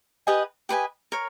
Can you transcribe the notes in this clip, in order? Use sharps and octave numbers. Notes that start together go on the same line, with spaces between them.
G4 B4 D#5 G#5
G4 B4 D#5 G#5
A#4 C#5